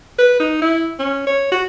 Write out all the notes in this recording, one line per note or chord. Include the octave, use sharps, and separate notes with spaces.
B4
D#4
E4
C#4
C#5
F#4